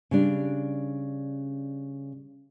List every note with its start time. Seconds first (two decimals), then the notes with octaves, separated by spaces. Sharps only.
0.11 C#3 G3 D4